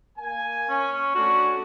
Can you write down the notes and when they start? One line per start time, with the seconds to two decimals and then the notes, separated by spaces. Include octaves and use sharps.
0.18 A#3 G#5
0.69 C#4
1.15 A3 C#4 D4 F#4